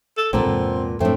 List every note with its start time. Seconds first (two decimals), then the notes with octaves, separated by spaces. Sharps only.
0.17 A4
0.33 A#1 E2 A#2 G3 B3 C4 A4
0.45 E2 G#2 C3
1.00 F#2 A2 F3 A3 C4 D4